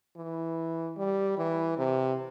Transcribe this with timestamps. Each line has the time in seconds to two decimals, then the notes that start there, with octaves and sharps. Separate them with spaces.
0.16 E3
0.97 G3
1.38 E3
1.78 C3